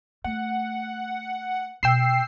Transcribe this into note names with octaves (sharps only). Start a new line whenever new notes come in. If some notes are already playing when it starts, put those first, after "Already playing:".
A3 F#5
B2 G5 E6 C7